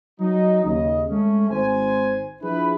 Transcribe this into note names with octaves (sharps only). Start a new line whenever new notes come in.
F#3 D#4
D#2 C#3 D#5
G#3 A3 C#4
G#1 C5 G#5
F3 D4 E4 G#4 B4